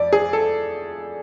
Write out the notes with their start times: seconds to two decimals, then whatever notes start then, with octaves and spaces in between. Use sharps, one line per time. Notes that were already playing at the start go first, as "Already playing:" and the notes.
Already playing: F2 D5
0.13 G#4
0.33 A4